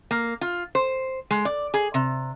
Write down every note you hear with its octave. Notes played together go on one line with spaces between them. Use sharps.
A#3
F4
C5
G#3
D5
G#4
C3